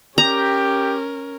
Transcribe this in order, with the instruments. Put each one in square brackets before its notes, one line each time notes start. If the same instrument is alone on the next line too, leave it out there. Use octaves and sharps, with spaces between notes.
[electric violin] C#4 A#4 [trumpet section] G4 [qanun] A#5